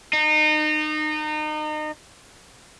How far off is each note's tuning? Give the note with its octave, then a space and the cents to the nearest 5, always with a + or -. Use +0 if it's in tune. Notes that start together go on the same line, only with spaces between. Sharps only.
D#4 -30